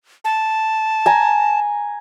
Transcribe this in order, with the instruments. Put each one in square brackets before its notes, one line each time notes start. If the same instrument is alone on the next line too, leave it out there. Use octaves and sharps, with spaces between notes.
[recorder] A5
[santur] G#5 A#5